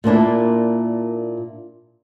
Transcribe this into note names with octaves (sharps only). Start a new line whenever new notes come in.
A#2 A#3 D4 E4